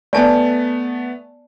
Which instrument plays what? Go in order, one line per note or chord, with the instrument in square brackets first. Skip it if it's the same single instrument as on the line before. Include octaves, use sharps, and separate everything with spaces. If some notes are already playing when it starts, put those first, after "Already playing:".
[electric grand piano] A3 B3 [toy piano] D5 G#5 A5